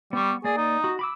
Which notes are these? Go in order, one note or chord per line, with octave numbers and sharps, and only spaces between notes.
G3 B3 C#6
A#3 G#4 D5
D#4
F#4
B5 D6 E6